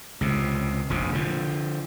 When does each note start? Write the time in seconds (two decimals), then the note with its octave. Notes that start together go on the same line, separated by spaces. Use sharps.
0.21 C#2 C3
0.90 F1 A#1 C3
1.13 D3 F3